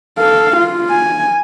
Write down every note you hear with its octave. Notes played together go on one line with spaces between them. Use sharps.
A4 F5
F4
G#5